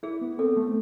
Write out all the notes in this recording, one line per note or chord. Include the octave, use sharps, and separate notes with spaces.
E4 G#4
B3
C4 A4
A3